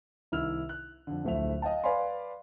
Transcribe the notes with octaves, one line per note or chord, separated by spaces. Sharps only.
C2 D#3 E4 E6 F6 F7
F#6
F2 D3
D1 A#1 A3 C5 E5 F7
D#5 F5 G5 A5
B4 D5 F5 G#5 B5 C6